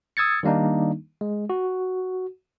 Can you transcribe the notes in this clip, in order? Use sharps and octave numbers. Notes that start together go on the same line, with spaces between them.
D#6 E6 G#6 A6 C#7
D#3 G3 A#3 D4 D#4
G#3
F#4